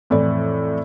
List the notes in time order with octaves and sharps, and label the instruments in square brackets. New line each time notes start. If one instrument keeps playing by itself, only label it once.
[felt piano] F2 A2 E3 D5